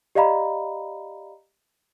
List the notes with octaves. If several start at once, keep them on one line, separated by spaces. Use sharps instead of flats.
G4 D5 D#5 F5 A#5 B5